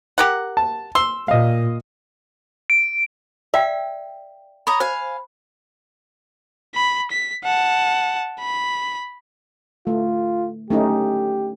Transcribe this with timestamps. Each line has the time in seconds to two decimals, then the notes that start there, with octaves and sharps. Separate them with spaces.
0.18 G4 A#4 F#5
0.57 A5
0.95 C6 E6
1.28 A#2 D#5 F5
2.70 D7
3.54 D5 E5 F5 G5
4.67 C#5 D#5 A#5 B5
4.80 C5 F5 G#5
6.75 B5
7.11 B6
7.44 F#5 A5
8.40 B5
9.87 A3 F4
10.70 A3 C#4 D#4 G4